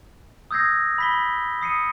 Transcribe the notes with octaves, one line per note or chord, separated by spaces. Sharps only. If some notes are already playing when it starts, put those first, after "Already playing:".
D#6 E6 G6 G#6 A#6 C7
B5 B6 G7
D#6 C7 C#7 D#7